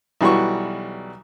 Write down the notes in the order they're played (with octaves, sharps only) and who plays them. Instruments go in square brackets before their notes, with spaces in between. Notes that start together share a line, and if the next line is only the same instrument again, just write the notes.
[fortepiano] B1 E3 G3 F#4 C#6